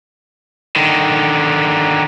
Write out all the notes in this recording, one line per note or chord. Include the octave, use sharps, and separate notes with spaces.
D3 D#3